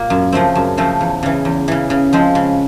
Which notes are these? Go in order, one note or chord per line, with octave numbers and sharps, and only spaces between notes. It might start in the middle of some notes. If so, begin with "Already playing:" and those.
Already playing: A#2 A#3
F#2
C#3 F3 A3 C4
F#2
C#3 F3 A3 C4
E2
C#3 E3
E2
C#3 E3
C#3
F3 G#3 C4
C#3